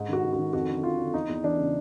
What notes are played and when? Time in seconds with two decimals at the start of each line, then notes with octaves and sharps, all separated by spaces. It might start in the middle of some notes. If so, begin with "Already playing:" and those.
Already playing: G#2
0.09 D#3 F#4
0.24 G#2
0.33 F#4
0.38 D#3
0.53 F2 F#4
0.69 D3
0.83 F2 F4
0.98 D3
1.14 E2 D#4
1.29 E2
1.44 E3 D4
1.59 C#3